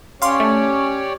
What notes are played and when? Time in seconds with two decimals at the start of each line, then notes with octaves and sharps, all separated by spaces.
0.22 C#4 G4 C#5 D5 F5 C6
0.40 A3